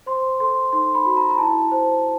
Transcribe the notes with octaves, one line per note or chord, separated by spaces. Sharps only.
C5 C6
A4 C6
D#4 C6
B5
F#4
A#5
A#5
E4 A5
C5